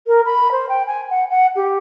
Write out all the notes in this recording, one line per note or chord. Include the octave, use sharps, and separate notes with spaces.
A#4
B5
C5
G5
G#5
F#5
F#5
G4